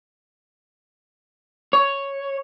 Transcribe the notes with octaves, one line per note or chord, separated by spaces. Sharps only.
C#5